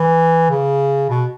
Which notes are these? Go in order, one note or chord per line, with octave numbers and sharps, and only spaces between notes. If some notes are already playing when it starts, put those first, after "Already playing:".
Already playing: E3
C#3
B2